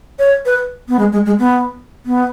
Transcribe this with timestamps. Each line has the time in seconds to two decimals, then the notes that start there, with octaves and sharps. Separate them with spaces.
0.19 C#5
0.46 B4
0.89 B3
0.99 G#3
1.12 G#3
1.26 G#3
1.39 B3
2.06 B3